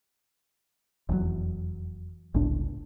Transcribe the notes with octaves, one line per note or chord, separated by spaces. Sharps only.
F1 E2 A#2 F#3
G1 C#2 A2 D4